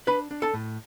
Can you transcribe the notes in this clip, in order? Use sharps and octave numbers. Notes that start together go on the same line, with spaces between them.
D4 B4 B5
D4
A4 A5
A2